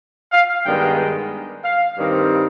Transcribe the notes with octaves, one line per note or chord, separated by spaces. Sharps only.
F5
G2 D#3 G#3 B3 G5
F5
G2 D#3 G3 C4